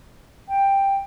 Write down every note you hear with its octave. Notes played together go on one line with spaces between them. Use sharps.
G5